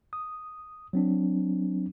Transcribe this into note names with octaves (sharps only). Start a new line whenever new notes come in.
D#6
F#3 C4 D4